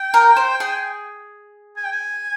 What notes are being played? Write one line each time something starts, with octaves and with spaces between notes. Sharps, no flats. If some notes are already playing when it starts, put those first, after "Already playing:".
Already playing: G5
A#4
C5
G#4
G#5
G5
G#5